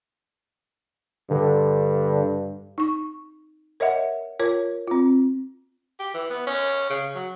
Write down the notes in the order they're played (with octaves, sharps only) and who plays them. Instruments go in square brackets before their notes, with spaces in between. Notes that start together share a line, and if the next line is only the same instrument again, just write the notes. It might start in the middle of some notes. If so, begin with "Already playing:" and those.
[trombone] G2 [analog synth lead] D3
[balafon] D#4 C#6
A#4 C#5 D#5 E5 F#5
F4 A#4 C#5
C4 F4
[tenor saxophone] G4
E3
B3
C#4
C#3
F#3